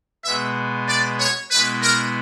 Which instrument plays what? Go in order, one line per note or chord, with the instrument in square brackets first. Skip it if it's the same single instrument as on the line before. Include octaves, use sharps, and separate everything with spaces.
[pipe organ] B2 G#3 B3 [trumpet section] E5
[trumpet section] D5
C#5
[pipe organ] B2 G#3 B3 E4 [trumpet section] B4
[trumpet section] A#4